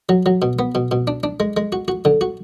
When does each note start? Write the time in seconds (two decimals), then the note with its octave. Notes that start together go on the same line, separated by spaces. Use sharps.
0.09 F#3
0.26 F#3
0.42 B2
0.59 B3
0.75 B2
0.91 B2
1.07 D4
1.23 D4
1.40 G#3
1.57 G#3
1.72 F#4
1.88 F#4
2.05 D3
2.21 F#4